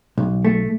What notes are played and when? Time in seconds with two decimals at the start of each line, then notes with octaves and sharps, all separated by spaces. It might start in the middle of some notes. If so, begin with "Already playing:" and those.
0.18 B1
0.45 A3